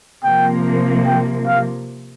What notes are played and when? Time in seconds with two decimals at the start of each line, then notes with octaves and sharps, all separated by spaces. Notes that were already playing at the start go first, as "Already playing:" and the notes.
0.24 C3 F3 A#3 G5
1.06 G5
1.47 F5